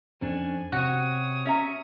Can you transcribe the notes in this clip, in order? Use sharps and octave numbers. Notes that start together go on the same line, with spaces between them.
F2 C#4 D4 G#5
C3 F#4 C#5 D#6
C#4 E5 A#5